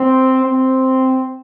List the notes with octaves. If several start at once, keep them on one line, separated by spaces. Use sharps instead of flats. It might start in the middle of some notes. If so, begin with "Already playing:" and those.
Already playing: C4
C4